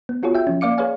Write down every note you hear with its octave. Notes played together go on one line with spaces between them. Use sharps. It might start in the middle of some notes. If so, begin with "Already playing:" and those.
B3
B3 F4 F#4 G#4 C#5
E5 G5
F3 C#4
A#3 D5 F5 D6 C#7
G#4 B4 C#5 D5 F5 G#5